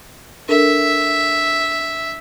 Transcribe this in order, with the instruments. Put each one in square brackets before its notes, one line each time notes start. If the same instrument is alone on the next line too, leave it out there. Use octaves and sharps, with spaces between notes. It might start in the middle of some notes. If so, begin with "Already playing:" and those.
[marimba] D4 A4 A#4 [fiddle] E5